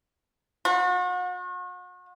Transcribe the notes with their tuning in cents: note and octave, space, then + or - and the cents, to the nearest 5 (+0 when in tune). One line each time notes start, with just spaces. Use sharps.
F#4 -40